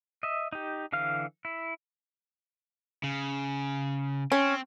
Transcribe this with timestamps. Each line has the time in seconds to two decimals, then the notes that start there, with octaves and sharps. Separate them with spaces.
0.23 D#5 E5
0.52 D#4 G4
0.93 D3 E3 F5 F6
1.45 E4
3.04 C#3
4.32 C4 C#4